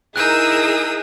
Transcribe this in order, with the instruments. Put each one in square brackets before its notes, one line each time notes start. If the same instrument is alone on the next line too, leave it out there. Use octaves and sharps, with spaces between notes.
[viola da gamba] D#4 E4 [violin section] G#4 A#4 [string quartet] D#6 E6 [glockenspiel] F#6 G6